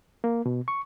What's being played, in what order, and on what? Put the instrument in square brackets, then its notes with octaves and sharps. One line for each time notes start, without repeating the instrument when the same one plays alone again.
[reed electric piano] A#3
B2
C#6